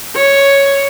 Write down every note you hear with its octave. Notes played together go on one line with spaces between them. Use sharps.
C#5